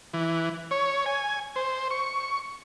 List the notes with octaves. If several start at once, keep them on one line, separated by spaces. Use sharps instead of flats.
E3
C#5
G#5
C5
C#6